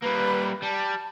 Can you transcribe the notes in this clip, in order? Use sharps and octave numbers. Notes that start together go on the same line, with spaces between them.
G3 A#3 B4
G3 A5